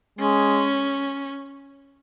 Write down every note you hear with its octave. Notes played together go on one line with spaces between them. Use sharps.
G#3 C#4